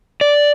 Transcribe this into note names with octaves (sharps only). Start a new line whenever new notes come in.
D5